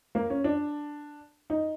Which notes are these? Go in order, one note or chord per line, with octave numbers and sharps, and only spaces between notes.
A#3
C#4
D4
D#4